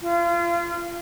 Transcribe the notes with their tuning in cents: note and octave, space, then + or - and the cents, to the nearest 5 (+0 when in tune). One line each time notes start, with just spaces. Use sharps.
F4 -30